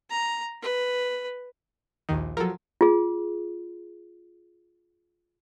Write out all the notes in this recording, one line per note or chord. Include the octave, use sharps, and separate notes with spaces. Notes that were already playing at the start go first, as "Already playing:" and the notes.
A#5
B4
A#1 D#2 D#3
F3 F#3 A4 A#4
F4 G#4